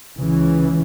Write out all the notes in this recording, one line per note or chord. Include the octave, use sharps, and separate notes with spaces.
C#2 C#3 E3